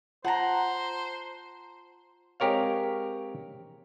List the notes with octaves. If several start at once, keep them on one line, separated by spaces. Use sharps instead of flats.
F4 C5 F#5 A5 A#5
G#3 C4 G4 A#4 C#5 F5